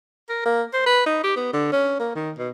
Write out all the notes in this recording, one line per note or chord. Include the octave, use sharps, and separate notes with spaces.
A#4
A#3
C5
B4
D#4
G4
B3
D3
C#4
A#3
D#3
B2